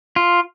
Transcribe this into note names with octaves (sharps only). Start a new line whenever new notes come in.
F4